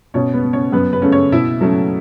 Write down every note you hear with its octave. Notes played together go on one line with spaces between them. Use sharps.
B2 C#4 C#5
B3 B4
B3
C#4 C#5
F#2 B3 B4
B3 B4
C#3 A3 C#4
C#4 C#5
B2 E4 E5
F#3 A3 C#4